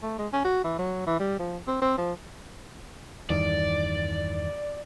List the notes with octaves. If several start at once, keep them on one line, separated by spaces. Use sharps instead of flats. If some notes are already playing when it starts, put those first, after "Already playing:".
A3
G#3
C#4
F#4
E3
F#3
E3
G3
F3
C4
C4
F3
E2 G2 D#3 D5